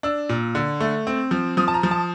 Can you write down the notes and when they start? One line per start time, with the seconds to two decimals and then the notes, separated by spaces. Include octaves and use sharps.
0.03 D4 E6
0.29 A#2
0.55 D3
0.80 A3
1.07 C4
1.31 F3
1.57 F3 D#6
1.68 A5
1.74 A#5
1.83 F3
1.91 A5